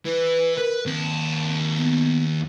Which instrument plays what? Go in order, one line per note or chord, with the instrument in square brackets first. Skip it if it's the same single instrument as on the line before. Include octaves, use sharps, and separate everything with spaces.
[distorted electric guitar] E3 [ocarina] B4
[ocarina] A#4 [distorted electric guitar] B4
[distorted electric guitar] D#2 A5 [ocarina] C4
[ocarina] B3